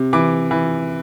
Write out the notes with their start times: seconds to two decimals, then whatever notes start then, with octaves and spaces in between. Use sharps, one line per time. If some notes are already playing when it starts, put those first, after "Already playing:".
Already playing: C3
0.13 E3 D6
0.51 E3